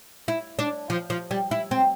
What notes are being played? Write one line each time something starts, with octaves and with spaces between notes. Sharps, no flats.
E4
D4
F3
F3
G3
E4
C4